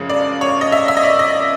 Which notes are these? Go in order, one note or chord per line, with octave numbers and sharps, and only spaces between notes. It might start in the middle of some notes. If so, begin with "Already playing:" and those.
Already playing: F#2 C#3 F3 G#3
D5
C#5
D#5
E5
E5
D#5
D5
D#5